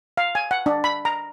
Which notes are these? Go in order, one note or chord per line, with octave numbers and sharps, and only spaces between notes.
F5
G#5
F#5
D4
B5
A#5